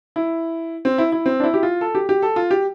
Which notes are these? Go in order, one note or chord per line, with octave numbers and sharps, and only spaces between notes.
E4
C4
E4
E4
C4
D4
E4
G4
F4
A4
G4
G4
A4
F4
G4